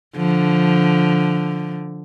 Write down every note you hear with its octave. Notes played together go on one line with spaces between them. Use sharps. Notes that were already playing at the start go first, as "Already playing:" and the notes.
D3 F3